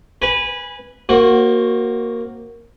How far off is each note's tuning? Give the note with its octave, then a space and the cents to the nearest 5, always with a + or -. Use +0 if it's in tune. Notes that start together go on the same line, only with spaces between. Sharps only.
B4 +0 G#5 -15 B5 -25
A#3 +0 F#4 +0 C5 +35